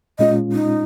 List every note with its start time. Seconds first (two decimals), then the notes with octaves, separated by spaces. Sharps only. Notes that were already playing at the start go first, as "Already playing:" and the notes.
0.19 A#2 G#3 C#4 F4 D#5
0.52 D#4